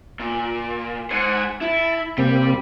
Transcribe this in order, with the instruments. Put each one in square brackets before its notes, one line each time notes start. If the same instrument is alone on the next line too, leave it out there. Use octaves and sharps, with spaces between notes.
[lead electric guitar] A#2
[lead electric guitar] G#2 C5 [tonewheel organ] F#5 G#5
[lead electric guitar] E4 [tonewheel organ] A5
[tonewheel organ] C3 A#3 C4 [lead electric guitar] G3